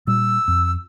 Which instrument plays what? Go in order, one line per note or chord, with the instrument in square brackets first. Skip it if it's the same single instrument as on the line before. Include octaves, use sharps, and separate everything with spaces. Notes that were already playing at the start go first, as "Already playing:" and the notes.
[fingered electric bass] A#2 G3 [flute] E6
[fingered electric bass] F2